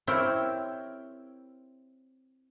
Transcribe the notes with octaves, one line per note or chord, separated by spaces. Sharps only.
C4 E4 G4 A#4 C#5